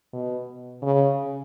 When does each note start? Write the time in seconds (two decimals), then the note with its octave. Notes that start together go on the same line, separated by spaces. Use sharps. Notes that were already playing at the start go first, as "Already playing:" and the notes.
0.13 B2
0.82 C#3